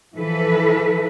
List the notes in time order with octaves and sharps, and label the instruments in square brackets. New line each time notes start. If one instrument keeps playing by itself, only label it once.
[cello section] E3 F3 A4 B4